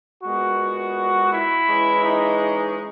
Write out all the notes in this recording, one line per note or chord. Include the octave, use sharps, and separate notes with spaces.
A#2 G#3 B3 F#4
E4
E3 G#3 C#4
D#4